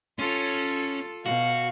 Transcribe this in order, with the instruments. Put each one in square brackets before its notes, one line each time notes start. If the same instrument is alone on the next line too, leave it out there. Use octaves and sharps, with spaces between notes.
[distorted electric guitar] C#4 [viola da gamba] F4 A4
[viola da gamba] B2 [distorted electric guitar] F#4 [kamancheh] F5